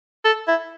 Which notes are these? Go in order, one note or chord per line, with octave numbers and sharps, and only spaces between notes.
A4
E4